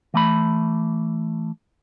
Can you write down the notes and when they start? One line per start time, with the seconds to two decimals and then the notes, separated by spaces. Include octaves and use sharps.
0.14 E3 A3 B5